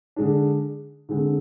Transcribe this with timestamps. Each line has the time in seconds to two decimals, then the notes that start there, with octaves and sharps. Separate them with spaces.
0.16 D3 G#3 D4
1.09 D3 G#3 C4